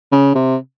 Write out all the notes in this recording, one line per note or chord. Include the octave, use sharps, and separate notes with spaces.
C#3
C3